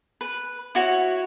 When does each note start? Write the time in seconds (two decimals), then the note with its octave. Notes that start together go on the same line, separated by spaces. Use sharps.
0.21 B4
0.75 E4 F#4 C#5